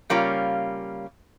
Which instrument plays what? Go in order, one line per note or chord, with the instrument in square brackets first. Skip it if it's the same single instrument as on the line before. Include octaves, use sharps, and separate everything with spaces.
[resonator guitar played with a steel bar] C#3 G3 A#3 C#4 F4